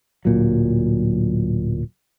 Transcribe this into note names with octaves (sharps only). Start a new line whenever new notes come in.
D1 A#2 F#3